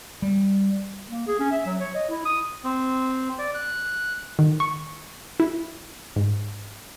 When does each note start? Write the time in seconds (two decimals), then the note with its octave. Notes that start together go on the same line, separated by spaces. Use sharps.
0.22 G3
1.09 A#3
1.27 G#4
1.39 C#4
1.52 E5
1.66 F#3
1.80 C#5
1.95 D#5
2.09 E4
2.25 D#6
2.64 C4
3.39 D5
3.54 F#6
4.39 D#3
4.60 C#6
5.40 E4
6.16 G#2